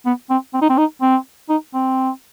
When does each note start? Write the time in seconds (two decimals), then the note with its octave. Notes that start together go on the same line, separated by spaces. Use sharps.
0.05 B3
0.30 C4
0.54 C4
0.62 D#4
0.69 C4
0.78 D#4
1.01 C4
1.49 D#4
1.74 C4